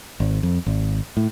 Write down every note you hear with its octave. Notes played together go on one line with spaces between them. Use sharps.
G#1
F2
G#1
A2